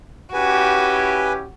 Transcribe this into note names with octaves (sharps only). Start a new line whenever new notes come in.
C#4 E4 F#4 G4 B4 G#5